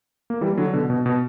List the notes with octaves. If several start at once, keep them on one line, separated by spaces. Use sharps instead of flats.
A#3
E3 G3
D3 F#3
B2 D3
B2
B2